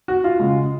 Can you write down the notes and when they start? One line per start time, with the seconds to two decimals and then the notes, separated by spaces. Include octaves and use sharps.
0.08 F#4
0.24 F4
0.40 C#3 G#3